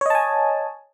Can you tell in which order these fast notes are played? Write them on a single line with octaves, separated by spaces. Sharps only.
C#5 D#5 A5 G#5